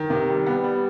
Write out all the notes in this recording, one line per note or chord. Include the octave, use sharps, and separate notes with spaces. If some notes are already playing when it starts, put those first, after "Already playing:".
Already playing: D#3
C3
G3
B3
G3